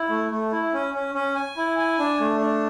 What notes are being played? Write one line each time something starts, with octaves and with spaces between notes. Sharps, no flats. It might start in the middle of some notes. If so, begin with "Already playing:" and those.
Already playing: E4
A3
A3
E4
C#4
C#4
C#4
G#5
E4
G#5
D4
A3
D4